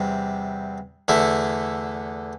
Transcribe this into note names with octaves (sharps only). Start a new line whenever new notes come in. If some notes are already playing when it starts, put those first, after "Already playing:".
Already playing: E2 C3 G3
E2 D3 A3 E4